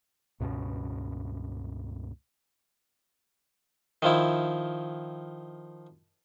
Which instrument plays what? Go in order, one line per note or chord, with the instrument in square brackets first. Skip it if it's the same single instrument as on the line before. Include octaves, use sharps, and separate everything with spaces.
[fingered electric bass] C#2 G2 B2 C#4
[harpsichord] D#3 F3 E4